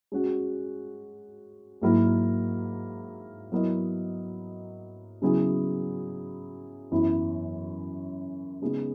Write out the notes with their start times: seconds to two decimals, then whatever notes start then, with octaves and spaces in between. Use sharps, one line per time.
0.12 G#3 C#4 F#4
1.82 G#2 F#3 A#3 E4 A#4
3.52 F#3 B3 E4 A#4 D#5
5.22 C#3 F#3 B3 E4 G#4
6.92 F#2 E3 B3 E4
8.62 C#3 G#3 B3 D#4